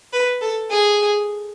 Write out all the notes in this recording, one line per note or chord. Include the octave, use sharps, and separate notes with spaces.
B4
A4
G#4